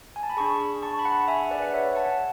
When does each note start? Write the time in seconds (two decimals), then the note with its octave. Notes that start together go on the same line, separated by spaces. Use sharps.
0.16 G#5
0.23 A5
0.30 B5
0.37 D4 G#4 A5 C#6
0.82 A5 C#6
0.99 B5
1.05 F#5 A5
1.28 E5 G#5
1.51 B4 D5
1.62 F#5
1.73 C#5 E5
1.96 F#5 A5